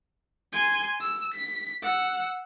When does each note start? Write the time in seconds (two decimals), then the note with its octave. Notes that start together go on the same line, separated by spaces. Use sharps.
0.53 G#5 C6
1.00 E6
1.34 B6
1.82 F#5 E6